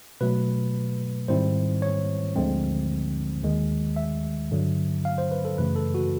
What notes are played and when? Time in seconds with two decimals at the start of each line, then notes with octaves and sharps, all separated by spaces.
0.21 B2 F#3 A3 B4
1.28 G#2 D#3 G3 C4 E4 C5
1.82 C#5
2.36 D2 D3 F3 G#3 C4
3.43 D#2 D#3 G#3
3.96 E5
4.51 G2 D3 F#3
5.05 F5
5.18 C5
5.32 B4
5.45 A4
5.58 F#2 C#3 E3 A3 B4
5.76 A4
5.94 F#4